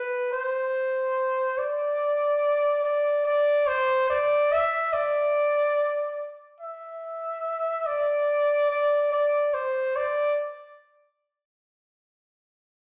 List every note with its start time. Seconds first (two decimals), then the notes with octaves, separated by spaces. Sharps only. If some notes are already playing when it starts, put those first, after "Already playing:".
Already playing: B4
0.33 C5
1.58 D5
2.84 D5
3.26 D5
3.67 C5
4.09 D5
4.52 E5
4.93 D5
6.60 E5
7.86 D5
8.70 D5
9.12 D5
9.54 C5
9.96 D5